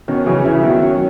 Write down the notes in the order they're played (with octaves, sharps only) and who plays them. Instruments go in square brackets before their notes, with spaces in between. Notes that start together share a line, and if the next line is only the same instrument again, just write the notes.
[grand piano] B2 D#3 [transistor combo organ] C#4
[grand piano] C#3 E3 [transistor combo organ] F#3
[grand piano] C#3 E3 [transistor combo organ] E4
[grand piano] B2 D#3 [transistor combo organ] F#3
[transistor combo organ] C#4